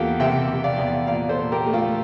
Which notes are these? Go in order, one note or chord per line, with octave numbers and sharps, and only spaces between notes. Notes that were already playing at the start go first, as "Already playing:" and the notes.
Already playing: E2 A#3 F4 G4 A4
C3 E5 G5
C3
D5 F5
E2
A#2 D5 F5
A4 C5
A#2
G4 A#4
A3
F4 A4